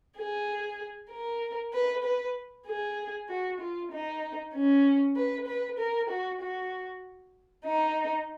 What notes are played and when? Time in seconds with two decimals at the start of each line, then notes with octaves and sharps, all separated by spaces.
0.17 G#4
1.11 A#4
1.73 B4
2.04 B4
2.67 G#4
3.29 F#4
3.60 F4
3.91 D#4
4.54 C#4
5.16 B4
5.47 B4
5.79 A#4
6.09 F#4
6.41 F#4
7.65 D#4